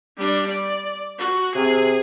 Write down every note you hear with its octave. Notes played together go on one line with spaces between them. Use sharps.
G3 D4
D5
F#4
C3 G#4